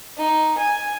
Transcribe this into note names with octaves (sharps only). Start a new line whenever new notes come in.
D#4
G#5